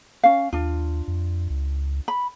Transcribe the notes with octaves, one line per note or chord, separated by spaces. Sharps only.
C#4 F5
D#2 D4 F4
F2
C#2
B5